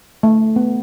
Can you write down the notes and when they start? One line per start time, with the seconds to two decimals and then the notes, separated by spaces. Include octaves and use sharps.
0.23 A3
0.56 B3